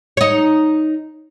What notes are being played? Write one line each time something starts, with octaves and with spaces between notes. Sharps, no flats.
D#4 C#5